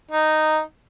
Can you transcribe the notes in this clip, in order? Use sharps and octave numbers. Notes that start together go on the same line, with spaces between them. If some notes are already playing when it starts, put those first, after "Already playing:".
D#4